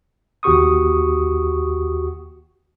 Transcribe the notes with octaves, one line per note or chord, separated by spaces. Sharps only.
D#2 F#4 G4 C#6 D#6